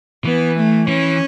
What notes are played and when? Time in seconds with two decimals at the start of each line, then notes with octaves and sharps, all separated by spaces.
0.25 E3 B3
0.56 A3
0.88 E3 C#4